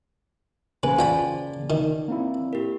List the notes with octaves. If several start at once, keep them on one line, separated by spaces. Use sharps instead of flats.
C#3 A#3 B4 C5 G#5
F4 D5 G5 A5 B5
D#3
A#3 C4 E4
G4 A#4